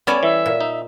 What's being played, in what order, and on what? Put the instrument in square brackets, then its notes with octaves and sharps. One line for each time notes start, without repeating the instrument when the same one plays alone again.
[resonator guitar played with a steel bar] G3 C#5 D5 [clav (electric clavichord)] B3 [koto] C#4 A4 G#5
[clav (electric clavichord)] E3 [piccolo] E5
[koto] A#2
[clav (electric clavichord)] D#4